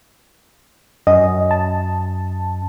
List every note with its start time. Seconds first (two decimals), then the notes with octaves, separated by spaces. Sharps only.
1.07 F#2 D#5
1.51 A5